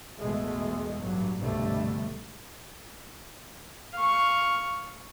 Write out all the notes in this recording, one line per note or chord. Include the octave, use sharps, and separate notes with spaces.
A1 E2 B2 G#3 A3
A1 G2 F#3
C2 G2 B2 D3 G3 A3
F5 C#6